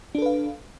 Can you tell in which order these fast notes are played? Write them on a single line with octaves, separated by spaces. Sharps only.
D4 A4 B4 F5